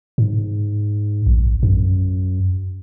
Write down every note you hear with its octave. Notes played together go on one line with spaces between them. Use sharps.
G#2
A#1
F#2